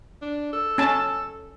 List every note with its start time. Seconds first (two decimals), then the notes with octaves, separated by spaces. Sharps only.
0.22 D4
0.53 A4
0.78 C#4 A5